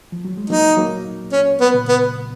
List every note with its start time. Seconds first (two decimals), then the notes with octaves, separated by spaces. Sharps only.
0.12 F3
0.25 F#3
0.37 G#3
0.50 F#3 A#3 D#4
0.77 F#3 A#3
1.32 C#4
1.61 B3
1.74 A#2 C#3
1.89 B3